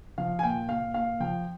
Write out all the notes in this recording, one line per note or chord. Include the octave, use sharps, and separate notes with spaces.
F3 F5
G#5
A#2 G5
A#2 F5
A#2 F5
F3 G5